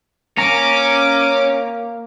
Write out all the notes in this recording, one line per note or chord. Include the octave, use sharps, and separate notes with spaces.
A#3 C#4 A#5 D6